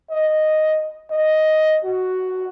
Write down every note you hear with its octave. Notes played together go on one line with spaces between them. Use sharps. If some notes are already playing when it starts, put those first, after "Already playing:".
D#5
D#5
F#4